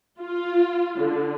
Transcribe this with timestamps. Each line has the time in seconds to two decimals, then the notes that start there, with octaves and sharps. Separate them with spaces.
0.20 F4
0.98 D3